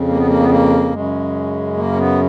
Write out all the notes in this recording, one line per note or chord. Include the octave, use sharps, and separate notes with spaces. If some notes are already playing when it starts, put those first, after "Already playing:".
Already playing: F2 C#3
A#3
B3
A#3
B3
A#3
F#2 C#3 G#3
A#3
C#4
B3